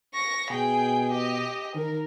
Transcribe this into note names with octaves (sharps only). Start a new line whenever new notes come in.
C#6 A#6
B2 G#4 G5
G4 D#5
D#3 A#4